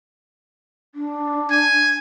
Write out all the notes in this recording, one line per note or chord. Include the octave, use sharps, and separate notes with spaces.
D4
G#5